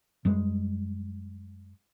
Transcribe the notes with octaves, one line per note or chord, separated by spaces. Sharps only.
F#2 G3 G#3